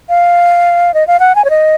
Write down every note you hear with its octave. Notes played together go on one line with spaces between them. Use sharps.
F5
D#5
F5
F#5
G#5
C#5
D#5